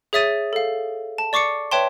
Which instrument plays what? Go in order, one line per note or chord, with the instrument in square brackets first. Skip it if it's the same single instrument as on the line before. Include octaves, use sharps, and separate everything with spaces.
[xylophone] G#4 C#5 E5 D#6 A6 D#7
A4 F5
A5
D5 C#6 D6 C7 C#7
B4 C#5 E5 G5 A5 C6